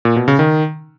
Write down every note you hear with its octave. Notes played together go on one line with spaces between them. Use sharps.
A#2
B2
C#3
D#3